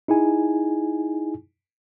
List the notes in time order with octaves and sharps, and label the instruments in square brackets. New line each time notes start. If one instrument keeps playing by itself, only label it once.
[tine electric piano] D#4 E4 G#4 G#5